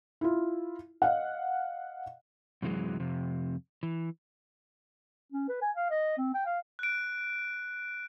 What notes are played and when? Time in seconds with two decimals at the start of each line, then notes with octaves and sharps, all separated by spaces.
0.21 E4 F4
1.02 D#5 F5 F#5
2.62 F#2 C3 E3 F#3 G#3
3.00 F2 C3
3.83 E3
5.32 C#4
5.49 B4
5.62 G#5
5.76 F5
5.90 D#5
6.18 C4
6.34 G5
6.46 F5
6.79 F#6 D7